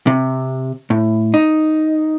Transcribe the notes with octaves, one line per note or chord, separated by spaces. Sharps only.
C3
A2
D#4